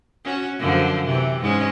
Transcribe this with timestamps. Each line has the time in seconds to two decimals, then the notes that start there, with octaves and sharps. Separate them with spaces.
0.24 C#4 F#4
0.59 F#2 D3 F3
1.06 C3 E3
1.41 G#2 G#3 C#4